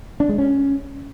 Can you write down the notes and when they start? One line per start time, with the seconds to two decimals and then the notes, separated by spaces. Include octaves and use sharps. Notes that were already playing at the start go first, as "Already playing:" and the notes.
0.20 D4
0.29 G#3
0.38 C#4